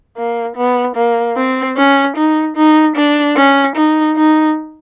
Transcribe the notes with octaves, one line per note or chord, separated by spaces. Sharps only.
A#3
B3
A#3
C4
C#4
D#4
D#4
D4
C#4
D#4
D#4